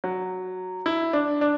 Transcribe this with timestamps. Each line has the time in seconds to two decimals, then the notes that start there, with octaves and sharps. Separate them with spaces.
0.04 F#3
0.86 E4
1.13 D4
1.41 D4